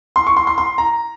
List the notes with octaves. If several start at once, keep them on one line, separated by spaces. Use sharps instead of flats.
C6
C#6
C6
C6
C6
A#5